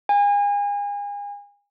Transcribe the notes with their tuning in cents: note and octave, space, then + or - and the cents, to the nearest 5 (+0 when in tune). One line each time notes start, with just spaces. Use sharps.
G#5 -35